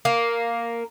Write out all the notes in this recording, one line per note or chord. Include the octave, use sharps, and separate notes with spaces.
A#3